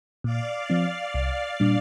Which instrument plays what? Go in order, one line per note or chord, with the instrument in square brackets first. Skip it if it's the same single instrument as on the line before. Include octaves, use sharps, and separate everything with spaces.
[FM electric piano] A#2 [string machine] D5 F5
[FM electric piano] F3 C4 [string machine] D5 F5
[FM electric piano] C2
A#2 G3 D4